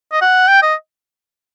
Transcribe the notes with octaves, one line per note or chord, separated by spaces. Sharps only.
D#5
F#5
G5
D#5